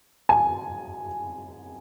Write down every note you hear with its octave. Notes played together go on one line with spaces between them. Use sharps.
G#5